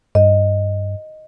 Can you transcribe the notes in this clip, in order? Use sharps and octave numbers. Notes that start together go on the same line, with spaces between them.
G2 D#5